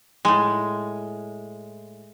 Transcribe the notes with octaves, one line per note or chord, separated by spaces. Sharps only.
A2 G#3